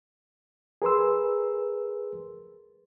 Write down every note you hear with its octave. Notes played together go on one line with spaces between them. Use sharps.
G#4 A#4 B4 C6 E6